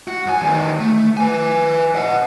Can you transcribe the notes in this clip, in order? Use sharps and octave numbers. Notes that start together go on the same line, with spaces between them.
F#4
F#2 G#5
E2 D#3
A3
B4 G#5
D#5 F#5